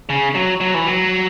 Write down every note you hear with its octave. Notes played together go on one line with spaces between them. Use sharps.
C#3
F#3
F#3
E3
F#3